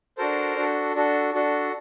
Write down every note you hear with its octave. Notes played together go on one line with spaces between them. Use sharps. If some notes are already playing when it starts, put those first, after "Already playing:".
D4 F#4 A4 A#4 C5
D4 F#4 A4
D4 F#4 A4
D4 F#4 A4